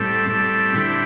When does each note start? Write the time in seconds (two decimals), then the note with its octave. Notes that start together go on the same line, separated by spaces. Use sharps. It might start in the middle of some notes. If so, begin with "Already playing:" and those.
Already playing: A2 G3 C4 A4
0.29 A2 G3 C4 A4
0.74 D3 C4 E4 G4